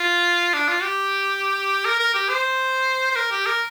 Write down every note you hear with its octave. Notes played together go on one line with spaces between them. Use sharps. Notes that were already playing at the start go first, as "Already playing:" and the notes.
Already playing: F4
D4
F4
G4
A#4
A#4
G4
C5
C5
A#4
G4
A#4